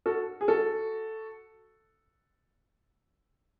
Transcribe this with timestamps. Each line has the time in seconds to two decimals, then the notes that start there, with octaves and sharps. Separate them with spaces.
0.06 F#4 A4
0.41 G#4
0.48 F#4 A4